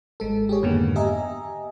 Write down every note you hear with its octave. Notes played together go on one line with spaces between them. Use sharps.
G#1 G#3 A4
G4 G#4 C#5
F2 G#2 D3 D#3 A#3 B3
G4 D#5 E5 G#5 A#5